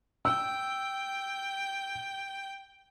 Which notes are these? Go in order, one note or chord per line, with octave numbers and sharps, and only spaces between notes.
G5 E6